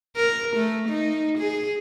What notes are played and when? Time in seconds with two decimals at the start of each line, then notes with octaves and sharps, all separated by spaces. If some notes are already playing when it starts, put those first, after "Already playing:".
0.16 A#4
0.56 A3
0.89 D#4
1.38 G#4